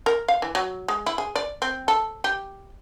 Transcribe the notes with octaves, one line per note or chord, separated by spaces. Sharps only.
A#4
F5
E3
F#3
G#3
E4
G#4
D5
C4
A4
G4